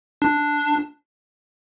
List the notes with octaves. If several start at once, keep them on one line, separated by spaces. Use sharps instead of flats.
D4